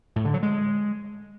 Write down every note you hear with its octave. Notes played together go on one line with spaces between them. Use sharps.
A2
D3
F#3
G#3